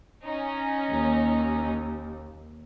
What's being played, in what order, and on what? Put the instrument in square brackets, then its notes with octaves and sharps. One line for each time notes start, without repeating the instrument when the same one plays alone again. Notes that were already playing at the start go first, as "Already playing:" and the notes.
[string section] C#4 D#4
[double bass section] D#2